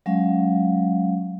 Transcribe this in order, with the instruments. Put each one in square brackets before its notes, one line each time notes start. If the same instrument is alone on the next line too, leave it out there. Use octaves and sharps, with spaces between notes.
[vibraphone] F#3 G#3 C#4 F5